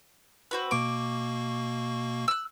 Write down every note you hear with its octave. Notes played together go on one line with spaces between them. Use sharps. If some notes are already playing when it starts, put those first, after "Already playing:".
C4 F#4 B4
B2 A#3 C#6 D6
E6 F#6